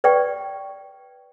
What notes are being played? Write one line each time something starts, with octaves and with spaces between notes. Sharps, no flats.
B4 D5 G5 C#6